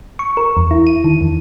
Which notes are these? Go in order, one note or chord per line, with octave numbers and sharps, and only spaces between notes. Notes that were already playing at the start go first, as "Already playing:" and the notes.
C#6
A#4
E2
E4
D#7
D#3
E2